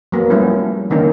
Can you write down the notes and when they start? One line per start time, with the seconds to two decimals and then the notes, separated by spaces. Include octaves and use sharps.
0.12 F#3 A#3 B3
0.30 F3 G3 A3 B3 C#4 E4
0.90 D3 D#3 A#3 C#4 D#4 A#4